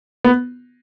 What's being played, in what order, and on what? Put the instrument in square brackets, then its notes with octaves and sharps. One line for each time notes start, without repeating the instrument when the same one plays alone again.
[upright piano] B3